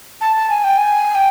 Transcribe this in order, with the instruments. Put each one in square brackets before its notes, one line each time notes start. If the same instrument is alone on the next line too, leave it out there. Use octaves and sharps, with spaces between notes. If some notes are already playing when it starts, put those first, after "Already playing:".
[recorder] A5
A5
G#5
G5
G#5
G5